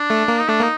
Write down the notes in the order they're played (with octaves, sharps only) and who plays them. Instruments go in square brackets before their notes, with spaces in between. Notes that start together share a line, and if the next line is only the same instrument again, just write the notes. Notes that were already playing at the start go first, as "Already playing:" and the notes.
Already playing: [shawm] D4
[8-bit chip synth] A3
A#3
[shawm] D#4
[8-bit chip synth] A3 [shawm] D4
[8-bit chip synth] A#3 [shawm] D#4